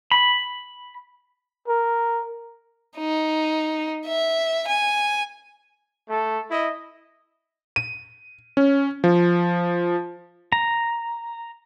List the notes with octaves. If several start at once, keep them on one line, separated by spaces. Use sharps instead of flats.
B5
A#4
D#4
E5
G#5
A3 A4
E4 D#5
D#7
C#4
F3
A#5